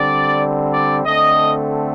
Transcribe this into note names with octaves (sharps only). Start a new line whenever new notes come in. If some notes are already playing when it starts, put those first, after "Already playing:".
Already playing: D3 G3 C4 D5
D5
D3 A3 C4 D#5